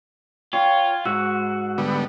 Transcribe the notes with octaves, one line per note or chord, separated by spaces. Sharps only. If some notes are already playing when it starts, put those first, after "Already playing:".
F4 C#5 G5
G#2 F#4 E6
D3 G3 B3